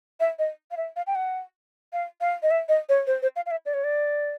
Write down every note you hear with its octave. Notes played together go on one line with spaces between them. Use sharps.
E5
D#5
F5
E5
F5
G5
F#5
F5
F5
D#5
E5
D#5
C#5
C5
C5
F5
F5
E5
D5
C#5
D5